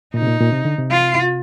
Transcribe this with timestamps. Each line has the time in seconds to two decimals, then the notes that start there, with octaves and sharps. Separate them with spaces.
0.14 A#2 D#4
0.22 C3
0.27 A#2
0.40 A#2
0.53 C3
0.65 D3
0.78 C3
0.91 F4